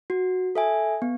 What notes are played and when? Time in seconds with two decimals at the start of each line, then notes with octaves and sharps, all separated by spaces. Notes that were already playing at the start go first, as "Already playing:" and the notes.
0.10 F#4
0.55 A4 E5 G#5
1.02 B3